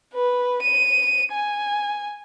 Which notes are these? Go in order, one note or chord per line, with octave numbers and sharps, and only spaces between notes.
B4
D#7
G#5